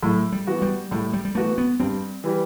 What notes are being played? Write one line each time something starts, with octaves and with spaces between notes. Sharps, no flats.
A2 F#3
G3
E3 B3 F#4
G3
A2 G3
G3
G3
E3 A3 B3 F#4
B3
G2 C4
E3 G3